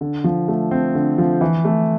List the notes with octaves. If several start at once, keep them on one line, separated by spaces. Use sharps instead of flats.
D3
F3
A3
C4
D3
F3
E3
A3